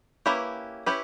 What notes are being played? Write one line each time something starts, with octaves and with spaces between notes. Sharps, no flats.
A#3 C#4 E4 G4 B4
C#4 E4 G4 B4